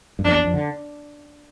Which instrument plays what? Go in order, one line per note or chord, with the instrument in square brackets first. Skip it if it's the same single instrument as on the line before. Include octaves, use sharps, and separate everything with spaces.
[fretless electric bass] G2
[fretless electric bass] F2 [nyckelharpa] D4
[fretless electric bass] E2
F2
D3